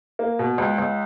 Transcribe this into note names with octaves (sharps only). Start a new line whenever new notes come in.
A#3
B2
C#2
C#2